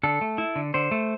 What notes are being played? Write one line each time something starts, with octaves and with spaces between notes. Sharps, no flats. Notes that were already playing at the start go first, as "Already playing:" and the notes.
D3 A4
A3
E4
D3
D3 C5
A3